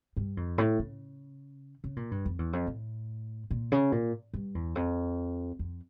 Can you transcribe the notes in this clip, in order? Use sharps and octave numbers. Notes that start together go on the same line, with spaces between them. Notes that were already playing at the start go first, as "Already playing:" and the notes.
G2
F2
A2
C#3
C#3
A#2
G2
F2
E2
F2
A2
A#2
C#3
A#2
G2
E2
F2
F2